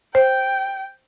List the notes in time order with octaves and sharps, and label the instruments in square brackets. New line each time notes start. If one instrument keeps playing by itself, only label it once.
[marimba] C5 [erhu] G5